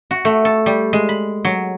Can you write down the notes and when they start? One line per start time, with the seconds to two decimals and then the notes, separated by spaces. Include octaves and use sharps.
0.11 F#4
0.25 A3
0.45 A4
0.66 G3
0.93 G#3
1.09 B5
1.45 F#3